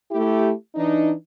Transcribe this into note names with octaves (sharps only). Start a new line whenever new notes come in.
A3 E4 G4
E3 D4 D#4